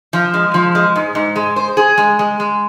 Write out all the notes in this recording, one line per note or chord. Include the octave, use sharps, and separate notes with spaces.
F3
G#3
F3
G#3
G#2
G#2
G#3
C5
G#4
G#3
G#3
G#3